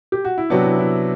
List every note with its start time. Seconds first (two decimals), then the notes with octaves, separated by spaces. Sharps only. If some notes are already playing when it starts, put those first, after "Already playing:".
0.12 G4
0.25 F#4
0.38 E4
0.50 C3 F#3 B3 D4
0.64 E4
0.79 E4